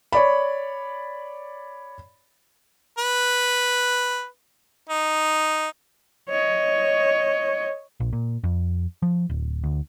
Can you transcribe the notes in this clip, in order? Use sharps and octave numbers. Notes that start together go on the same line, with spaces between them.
C#5 D5 B5
B4
D#4
C#5 D#5
A#1
A#2
F2
F3
D1
D2